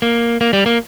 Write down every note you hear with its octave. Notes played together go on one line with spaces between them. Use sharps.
A#3
A#3
G3
A#3